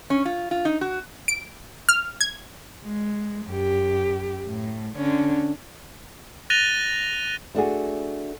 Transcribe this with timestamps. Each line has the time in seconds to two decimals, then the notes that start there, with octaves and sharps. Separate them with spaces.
0.10 C#4
0.25 F4
0.51 F4
0.65 D#4
0.81 F#4
1.28 D7
1.89 F6
2.21 G#6
2.84 G#3
3.47 F#2 G4
4.46 A2
4.95 D3 C#4
6.50 F#6 A6 A#6 D#7 F7 G7
7.55 A3 D4 F#4 G#4